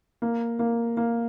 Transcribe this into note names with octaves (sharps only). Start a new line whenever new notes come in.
A#3
A#3
A#3